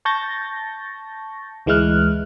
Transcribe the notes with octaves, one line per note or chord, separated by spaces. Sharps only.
A5 C#6 G6 A6 A#6
D2 E3 G#3 E4 F6 F#6